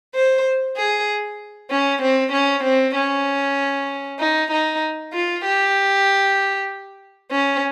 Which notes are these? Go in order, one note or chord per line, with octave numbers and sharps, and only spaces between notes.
C5
G#4
C#4
C4
C#4
C4
C#4
D#4
D#4
F4
G4
C#4